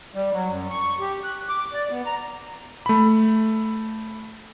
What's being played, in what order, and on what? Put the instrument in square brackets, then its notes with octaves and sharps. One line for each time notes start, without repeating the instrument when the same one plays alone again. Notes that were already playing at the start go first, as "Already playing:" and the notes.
[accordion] G3
F#3
F#2
C#6
G4
F#6
D6
D5
B3
A#5
[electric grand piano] A3 B5